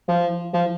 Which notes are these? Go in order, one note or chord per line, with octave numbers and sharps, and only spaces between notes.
F3
F3